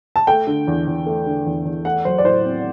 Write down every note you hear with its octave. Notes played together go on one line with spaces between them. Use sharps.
A5
A3 G5
D3
E2
E2
A3
D3
E2
E2
A3 F#5
F#3 C5
D5
A2 C5
C4